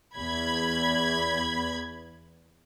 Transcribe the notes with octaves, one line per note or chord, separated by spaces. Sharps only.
E2 B5 G#6